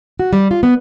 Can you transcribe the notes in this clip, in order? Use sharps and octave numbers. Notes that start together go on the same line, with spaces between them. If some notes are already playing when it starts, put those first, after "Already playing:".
F#4
G3
F4
B3